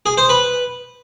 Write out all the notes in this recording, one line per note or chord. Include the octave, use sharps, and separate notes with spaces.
G#4
C5
B4